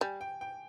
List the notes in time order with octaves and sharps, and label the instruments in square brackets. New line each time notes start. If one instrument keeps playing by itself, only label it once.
[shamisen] G3 [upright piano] G#5
[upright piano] G5
G5